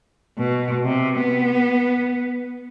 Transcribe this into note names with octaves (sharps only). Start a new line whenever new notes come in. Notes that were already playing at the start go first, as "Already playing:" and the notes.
B2
C3
B3